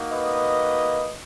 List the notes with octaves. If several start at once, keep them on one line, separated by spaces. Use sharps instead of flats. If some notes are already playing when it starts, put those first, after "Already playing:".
Already playing: A#3 D#4 F#4
B4 D#5